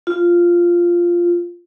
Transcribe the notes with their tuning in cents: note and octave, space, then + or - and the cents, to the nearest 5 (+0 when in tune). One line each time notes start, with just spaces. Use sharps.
F4 -5